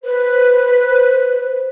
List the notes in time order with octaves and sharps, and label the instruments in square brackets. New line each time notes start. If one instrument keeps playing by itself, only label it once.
[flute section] B4 C5